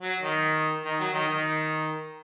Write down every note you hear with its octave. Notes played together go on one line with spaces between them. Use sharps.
F#3
D#3
D#3
F#3
D#3
D#3